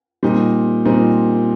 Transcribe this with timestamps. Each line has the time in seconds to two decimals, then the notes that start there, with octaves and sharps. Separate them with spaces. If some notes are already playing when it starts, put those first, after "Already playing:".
0.23 A#2 G3 C4 D#4
0.86 A#2 G3 C4 D#4